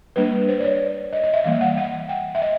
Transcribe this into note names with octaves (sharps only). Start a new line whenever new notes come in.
G3 A#3 D4 B4
C5
D5
C#5
D#5
D#5
E5
E3 G3 A#3 F5
F#5
F#5
G5
E5
D#5